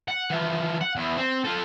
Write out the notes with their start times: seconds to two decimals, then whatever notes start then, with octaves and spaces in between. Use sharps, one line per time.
0.08 F#5
0.30 E3 F3
0.81 F#5
0.95 E2
1.17 C4
1.45 F4 A4